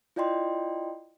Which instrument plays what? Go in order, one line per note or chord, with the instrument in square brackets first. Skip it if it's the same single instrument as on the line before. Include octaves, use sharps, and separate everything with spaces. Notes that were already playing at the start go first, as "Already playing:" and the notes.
[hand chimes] E4 F4 D5 D#5 G5 C6